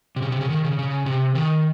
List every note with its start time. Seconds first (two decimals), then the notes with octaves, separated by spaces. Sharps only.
0.16 C3
0.22 C#3
0.32 C3
0.41 C#3
0.50 D#3
0.64 C#3
0.79 C#3
1.06 C3
1.35 D#3